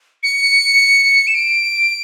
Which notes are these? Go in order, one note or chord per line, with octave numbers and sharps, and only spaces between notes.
C#7
E7
D7